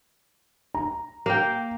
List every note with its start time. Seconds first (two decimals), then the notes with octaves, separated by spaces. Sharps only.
0.75 A#5
1.26 A#3 F5 G5